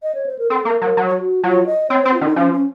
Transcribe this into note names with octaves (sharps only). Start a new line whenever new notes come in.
D#5
C#5
C5
A#4
C4 A4
A#3 A#4
F#3 A#4
F#3
F#4
F#3 F4
D#5
C4 C#5
C4 C5
F4
D#3 C#4
D#4
F3 C#4
C#4